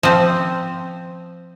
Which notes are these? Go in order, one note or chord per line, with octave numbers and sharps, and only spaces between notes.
F3 C4